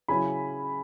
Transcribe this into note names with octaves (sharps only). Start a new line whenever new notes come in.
C#3 F#3 C#4 E4 G#5 B5